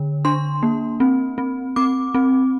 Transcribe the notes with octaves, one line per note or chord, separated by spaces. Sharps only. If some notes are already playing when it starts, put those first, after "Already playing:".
Already playing: D3
D4 C6
A#3
C4
C4
C4 D6
C4